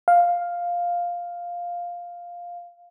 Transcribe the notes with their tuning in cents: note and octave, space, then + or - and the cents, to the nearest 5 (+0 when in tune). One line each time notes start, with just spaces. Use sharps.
F5 +5